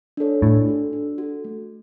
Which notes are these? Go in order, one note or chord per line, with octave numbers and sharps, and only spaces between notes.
D4 A4 C#5
A2 D4
F#4 A4
D4
F#4 A4
A3